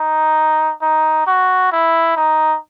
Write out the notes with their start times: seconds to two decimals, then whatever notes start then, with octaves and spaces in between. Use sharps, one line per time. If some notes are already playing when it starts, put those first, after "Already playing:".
Already playing: D#4
0.81 D#4
1.26 F#4
1.72 E4
2.16 D#4